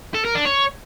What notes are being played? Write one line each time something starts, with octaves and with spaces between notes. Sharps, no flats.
A4
A#4
D4
C#5